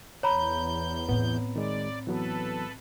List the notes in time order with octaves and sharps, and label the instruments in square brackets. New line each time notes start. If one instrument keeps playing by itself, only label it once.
[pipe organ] E2 G6 [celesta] C#5 A#5 B5
[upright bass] A2 C4 [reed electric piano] B3
[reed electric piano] D#3 G#3 [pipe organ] D5
[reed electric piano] E3 F#3 B3 [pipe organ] A4 B4